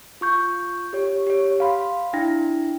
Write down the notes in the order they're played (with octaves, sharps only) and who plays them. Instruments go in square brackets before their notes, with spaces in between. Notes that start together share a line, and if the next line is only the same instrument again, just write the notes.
[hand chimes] F4 C#6 G6
G4 C#5
G4 C#5
F5 B5 C6
D4 E4 G5 A#6